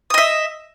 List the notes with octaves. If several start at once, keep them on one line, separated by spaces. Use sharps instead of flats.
D#5 E5 D#6